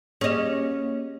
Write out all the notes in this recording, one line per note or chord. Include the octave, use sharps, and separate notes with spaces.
A#3 C#4 G4 G#4 D#5